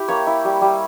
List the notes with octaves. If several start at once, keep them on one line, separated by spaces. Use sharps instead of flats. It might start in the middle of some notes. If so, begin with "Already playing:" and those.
Already playing: E4 G4
A#3 C#5
E4
G3
G3